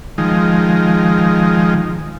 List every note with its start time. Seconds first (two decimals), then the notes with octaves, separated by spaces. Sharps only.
0.18 D#3 F3 G#3